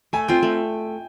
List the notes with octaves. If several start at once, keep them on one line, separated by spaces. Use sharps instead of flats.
A3 G#5
C4 F4 G5
A3